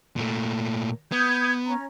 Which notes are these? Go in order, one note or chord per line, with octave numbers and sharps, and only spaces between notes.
A#2 A3
B3 D#6 G6 G#6
C#4 A#5